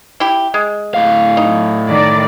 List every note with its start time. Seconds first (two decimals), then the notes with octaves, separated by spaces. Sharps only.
0.20 E4 G4
0.54 G#3
0.94 A2 F5
1.37 D#4
1.88 D#3 D5